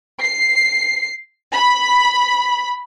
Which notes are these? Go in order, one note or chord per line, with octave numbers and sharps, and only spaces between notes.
C7
B5